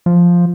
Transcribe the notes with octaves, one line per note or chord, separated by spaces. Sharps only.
F3